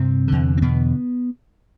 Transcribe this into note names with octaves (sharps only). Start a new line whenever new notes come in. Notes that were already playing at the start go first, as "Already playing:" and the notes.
Already playing: G2 C3 C4
E2 D3
C4
B2 B3